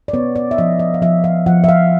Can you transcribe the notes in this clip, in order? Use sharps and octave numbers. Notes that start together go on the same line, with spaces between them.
D5
B3 C#5
D5
E5
F3 D#5
D#5
F5
F3 E5
F5
F3 F#5
E5
F5